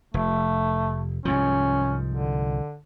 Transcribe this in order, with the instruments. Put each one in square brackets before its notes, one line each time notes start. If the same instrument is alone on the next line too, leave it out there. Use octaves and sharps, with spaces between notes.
[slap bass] F1 [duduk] A3
[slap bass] C2 G#2 F3 [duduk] C#4
[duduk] D3